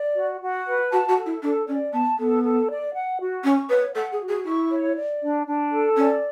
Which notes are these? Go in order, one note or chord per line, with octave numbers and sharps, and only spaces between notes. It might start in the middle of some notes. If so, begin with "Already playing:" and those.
Already playing: D5
F#4
F#4
B4
F#4 A5
F#4
A4
E4
D4 A4
C#4 D5
B3 A5
B3 A4
A4
D5
F#5
F#4
C#4 C#6
B4 C#5
A4 F#5
G#4
F#4
G#4
E4 C#6
C#5
D5
D4
D4
A4
C#4 D5